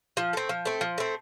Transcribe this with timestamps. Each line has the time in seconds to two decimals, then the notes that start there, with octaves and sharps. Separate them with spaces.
0.17 F3
0.33 A3 C4
0.49 F3
0.65 A3 C4
0.81 F3
0.98 A3 C4